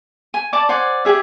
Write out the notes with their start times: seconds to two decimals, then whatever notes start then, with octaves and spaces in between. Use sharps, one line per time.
0.34 G#5
0.53 D5 A5 C#6 D6
0.69 C5 D5 F#5 G#5
1.05 G4 G#4 E5